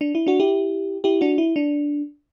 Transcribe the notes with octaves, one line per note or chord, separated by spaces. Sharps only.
D4
E4
D4 F#4
E4 G4
E4 G4
D4 F#4
E4
D4